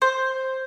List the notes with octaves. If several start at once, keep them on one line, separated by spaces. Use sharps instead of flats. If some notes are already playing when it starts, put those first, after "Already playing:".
C5